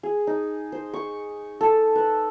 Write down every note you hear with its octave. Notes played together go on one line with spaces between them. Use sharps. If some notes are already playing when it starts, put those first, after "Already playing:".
G#4
D#4
C5
C#6
A4
B4